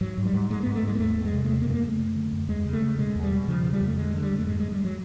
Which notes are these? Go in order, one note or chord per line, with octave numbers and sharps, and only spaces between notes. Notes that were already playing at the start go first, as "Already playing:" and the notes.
G#2 F#3
G#2
G3
G#2
G#2 G#3
G#2 B3
A3
G#2 G#3
A#3
E2 A3
E2
G#3
C3
G#3
C#3 A3
A#3
F#2 A3
A#3
C#3 A3
F#2
D3
F#2
E2 G#3
C#3
A3
C#3
B2 G#3
E2
G3
B2
C#3 F3
C#3
G3
F2
A3
D3 G#3
D3
G3
F2
A3
G#2 G#3
G#2 G#3
G3
F#3